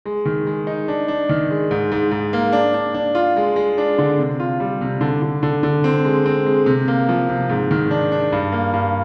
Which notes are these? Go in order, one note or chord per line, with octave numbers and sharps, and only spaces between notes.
G#3
D#3
G#3
D#4
D4
D4
D#3
G#3
G#2
G#2
G#2
A#3
D4
D4
D4
F4
G#3
G#3
D4
D3
C3
F4
G3
C3
D3
D3
D3
D3
C4
G#3
C4
G#3
C3
A#3
F3
C3
G#2
D#3
D4
D4
G2
A#3
G2